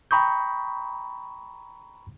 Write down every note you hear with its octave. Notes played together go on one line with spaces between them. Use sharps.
G5 A#5 B5 C#6 D#6 G6